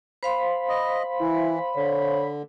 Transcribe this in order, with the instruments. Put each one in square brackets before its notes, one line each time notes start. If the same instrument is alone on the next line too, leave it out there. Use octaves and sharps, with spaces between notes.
[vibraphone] C5 F5 C6 [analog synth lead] B5
[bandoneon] D#5
[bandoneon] E3 [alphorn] E4
[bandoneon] D3 [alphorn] C#5